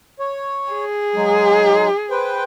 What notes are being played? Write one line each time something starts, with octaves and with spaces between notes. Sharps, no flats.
C#5
G#4
F#3 G#3 D#4
B4 C5 G5